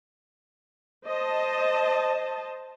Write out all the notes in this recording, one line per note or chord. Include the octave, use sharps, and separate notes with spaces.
C5 D#5 A5